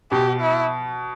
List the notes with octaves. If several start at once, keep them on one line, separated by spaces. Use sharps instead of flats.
B2 G4
E4